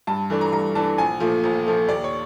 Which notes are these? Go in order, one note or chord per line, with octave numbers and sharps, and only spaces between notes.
G2 A5
E3 A3 D4
A#5
G2 A#5
E3 A3 D4 A5
A#1 G#5
A#2 F3 A3
A#1
A#2 F3 A3
D#2 D5
C#5